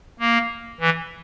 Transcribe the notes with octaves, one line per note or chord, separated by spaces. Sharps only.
A#3
E3